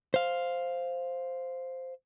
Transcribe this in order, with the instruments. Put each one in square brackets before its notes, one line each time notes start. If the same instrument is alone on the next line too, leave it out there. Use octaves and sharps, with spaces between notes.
[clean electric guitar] C5 F5